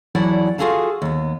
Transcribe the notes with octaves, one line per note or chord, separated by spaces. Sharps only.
E2 F#3 E4 D5 F#5 A5
F4 F#4 G#4 A4 F5 A5
D#2 B3